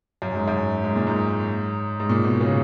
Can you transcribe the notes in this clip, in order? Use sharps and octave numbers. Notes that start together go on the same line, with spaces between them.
F#2
G#2
F#2
G#2
A#2
G#2
G#2
A#2
B2
C#3